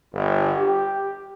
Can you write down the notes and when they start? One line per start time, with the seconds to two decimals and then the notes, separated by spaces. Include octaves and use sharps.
0.13 G1
0.56 G4